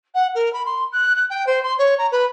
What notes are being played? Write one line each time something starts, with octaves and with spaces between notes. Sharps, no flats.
F#5
A#4
B5
C6
F#6
F#6
G5
C5
C6
C#5
A#5
B4